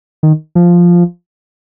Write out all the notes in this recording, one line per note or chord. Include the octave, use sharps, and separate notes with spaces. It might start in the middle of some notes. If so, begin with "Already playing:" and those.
D#3
F3